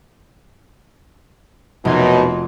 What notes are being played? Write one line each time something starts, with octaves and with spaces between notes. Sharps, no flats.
F1 F#2 B2 D#4 C6 G#6